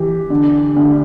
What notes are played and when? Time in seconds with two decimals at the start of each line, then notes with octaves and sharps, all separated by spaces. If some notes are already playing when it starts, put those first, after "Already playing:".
Already playing: E3 G4
0.30 D3
0.76 D2